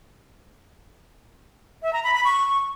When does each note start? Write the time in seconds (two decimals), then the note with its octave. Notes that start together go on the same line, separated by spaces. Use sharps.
1.82 E5
1.93 A#5
2.04 B5
2.14 B5
2.25 C#6